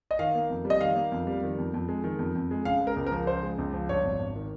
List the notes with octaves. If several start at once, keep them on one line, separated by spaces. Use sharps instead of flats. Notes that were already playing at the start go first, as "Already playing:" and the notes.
D#5
D#3 F5
A#3
F2
G3
D#5
D#3 F5
A#3
F2
G3
D#3
F2
F2
G#3
D#3
F2
F2
G#3
C#3 F5
G#3
A#4
C#2
A#4
F3
C#3 C5
G#3
C#2
F3
G2 C#5
G#1
G#1
D#3